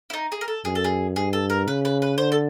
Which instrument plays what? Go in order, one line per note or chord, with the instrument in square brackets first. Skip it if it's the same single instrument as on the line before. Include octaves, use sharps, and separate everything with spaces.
[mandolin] E4
D#4
G#4
A#4
A4
[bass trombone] F#2 [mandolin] G#4
[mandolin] A4
G#4
[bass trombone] G2 [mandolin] G#4
[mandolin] A4
A#4
[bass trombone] C#3 [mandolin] B4
[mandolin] B4
B4
[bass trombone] D3 [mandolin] C5
[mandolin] A4